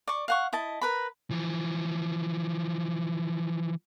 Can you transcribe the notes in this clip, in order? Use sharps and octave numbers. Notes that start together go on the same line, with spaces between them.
D5 C#6
F5 F#5 C#6
E4 D#5 A5
A#4 B4 B5
E3 F3